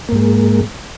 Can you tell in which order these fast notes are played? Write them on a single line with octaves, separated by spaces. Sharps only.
A#3 G#2 G#3